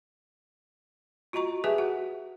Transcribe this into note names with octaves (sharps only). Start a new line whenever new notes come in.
F4 F#4 D#5 A#5 C#6
G4 G#4 B4 E5 G#5 A5
F#4 F#5